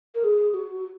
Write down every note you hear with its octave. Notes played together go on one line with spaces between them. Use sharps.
A#4
G#4
F#4